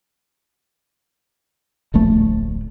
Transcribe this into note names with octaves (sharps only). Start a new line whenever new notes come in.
D1 A#1 A3